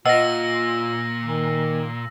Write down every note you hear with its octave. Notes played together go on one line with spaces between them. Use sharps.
A#2 F4 B4 D#5 F#5 E6 A#6
D#3